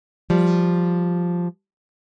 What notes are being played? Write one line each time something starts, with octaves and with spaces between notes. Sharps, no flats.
F3 G3